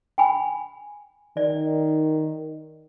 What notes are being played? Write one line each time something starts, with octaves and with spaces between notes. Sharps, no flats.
G5 G#5 B5
D#3 D5